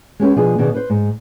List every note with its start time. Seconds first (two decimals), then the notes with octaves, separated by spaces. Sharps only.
0.20 G#3 C#4 G4 B4
0.36 B2 F3 D4 F4 G#4
0.58 B2 D#3 G#4 D5
0.74 B4 C5
0.90 G#2